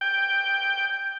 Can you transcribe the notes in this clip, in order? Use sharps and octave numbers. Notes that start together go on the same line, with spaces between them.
G5